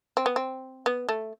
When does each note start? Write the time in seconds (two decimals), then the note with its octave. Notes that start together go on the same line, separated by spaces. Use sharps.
0.17 C4
0.26 B3
0.36 C4
0.86 B3
1.09 A3